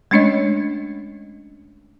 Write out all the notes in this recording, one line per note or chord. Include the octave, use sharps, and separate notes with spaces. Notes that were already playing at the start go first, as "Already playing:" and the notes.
G#3 A3 C#4 D4 C#5 D#5